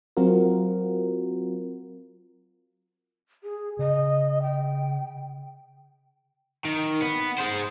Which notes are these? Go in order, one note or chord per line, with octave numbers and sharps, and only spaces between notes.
F#3 C4 F4 F#4 A#4
G#4
C#3 D#5
G5
D#3
B3
G#3 C5